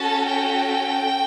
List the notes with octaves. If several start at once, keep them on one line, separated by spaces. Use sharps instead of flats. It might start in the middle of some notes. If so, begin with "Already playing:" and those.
Already playing: C#4 F#4 A4 A5
G5